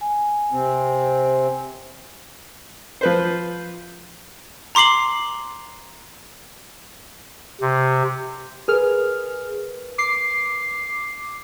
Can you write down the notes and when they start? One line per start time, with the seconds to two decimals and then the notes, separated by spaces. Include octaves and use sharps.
0.01 G#5
0.52 C3 C4
3.01 F3 B4 C5
4.75 A#5 C6 D6 C7 F#7
7.61 C3
8.68 G#4 A#4 B4 F6
9.98 D6 C7